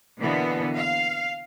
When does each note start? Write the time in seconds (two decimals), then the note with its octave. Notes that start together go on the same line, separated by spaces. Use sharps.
0.19 B2 D3 E3 A#3 B3
0.75 F5